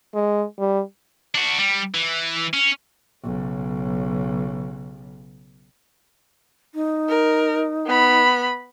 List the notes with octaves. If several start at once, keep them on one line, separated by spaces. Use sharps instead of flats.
G#3
G3
D4 F#4
G3
E3
C#4
B1 C#3
D#4
A#4
B3 B5